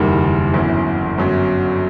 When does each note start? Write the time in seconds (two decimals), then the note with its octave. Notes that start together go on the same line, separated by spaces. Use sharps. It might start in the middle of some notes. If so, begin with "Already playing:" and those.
Already playing: F#1 E2 D#3 G3
0.53 G1 F#2 E3
1.18 G1 F#2 F#3